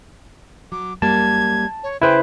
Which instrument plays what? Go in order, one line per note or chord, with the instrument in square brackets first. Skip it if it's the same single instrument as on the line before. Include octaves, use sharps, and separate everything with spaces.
[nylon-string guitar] F#3 [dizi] D6
[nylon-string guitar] F#2 G3 A#3 [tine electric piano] A5 [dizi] G#6
[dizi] C#5
[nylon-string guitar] C#3 G#4 [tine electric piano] E4 B4 C5 [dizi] G5